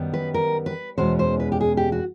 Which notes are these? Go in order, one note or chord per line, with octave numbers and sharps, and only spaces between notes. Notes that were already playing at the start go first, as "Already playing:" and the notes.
Already playing: F#2 D#3 G3 B3
B4
A#4
B4
E2 B2 G#3 C#4 C5
C5
B4
G4
G#4
G4
F#4